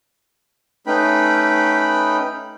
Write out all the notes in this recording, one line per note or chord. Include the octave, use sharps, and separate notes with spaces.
A3 C#4 D#4 B4 G5 B5